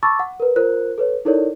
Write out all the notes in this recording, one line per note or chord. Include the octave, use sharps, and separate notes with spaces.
A5 B5 C#6 D6 E6 A6
F#5
A#4 B4
F4 A#4 C5 F#6
A4 B4 C#5
D#4 E4 A4 A#4 C#5 D5